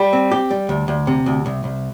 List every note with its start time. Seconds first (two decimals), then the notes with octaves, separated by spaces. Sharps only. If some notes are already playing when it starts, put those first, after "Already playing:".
Already playing: G3
0.13 C4
0.31 G4
0.51 G3
0.69 D2
0.88 D2
1.07 C3
1.26 D2
1.46 C2
1.64 C2